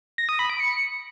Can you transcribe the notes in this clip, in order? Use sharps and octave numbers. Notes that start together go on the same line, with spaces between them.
A#6
D#6
B5
D7
C#7